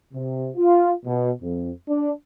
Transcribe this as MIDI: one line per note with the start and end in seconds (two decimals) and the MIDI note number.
0.14 0.50 48
0.56 0.92 65
1.06 1.31 47
1.42 1.71 41
1.89 2.12 62